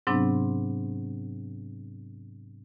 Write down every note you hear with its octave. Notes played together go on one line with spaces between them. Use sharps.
G#2 C3 F#3 B3 C4 D4